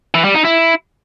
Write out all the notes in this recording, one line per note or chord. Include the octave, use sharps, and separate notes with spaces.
E3
G3
D#4
E4